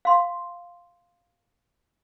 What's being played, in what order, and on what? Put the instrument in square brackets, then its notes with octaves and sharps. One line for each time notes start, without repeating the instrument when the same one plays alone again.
[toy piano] F5 C6